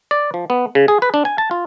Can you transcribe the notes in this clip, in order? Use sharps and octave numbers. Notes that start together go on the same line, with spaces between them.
D5
F3
B3
C#3
G#4
B4
D4
G#5
A5
F4